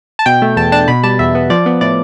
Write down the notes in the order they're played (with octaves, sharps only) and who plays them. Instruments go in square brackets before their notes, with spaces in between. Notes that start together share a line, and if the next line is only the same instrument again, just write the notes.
[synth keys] A5
B2 G5
A3
E2 A5
D4 A5
B2 B5
G3 A5
E2 E5
B3
F3 D5
B3
A2 D5